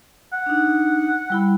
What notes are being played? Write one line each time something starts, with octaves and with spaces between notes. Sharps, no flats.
F#5
D4 D#4
G3 E4 B5